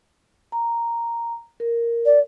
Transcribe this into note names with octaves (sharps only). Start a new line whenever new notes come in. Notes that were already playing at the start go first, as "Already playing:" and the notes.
A#5
A#4
D5